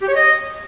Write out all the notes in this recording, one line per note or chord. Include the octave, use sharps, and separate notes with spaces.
G4
C#5
D#5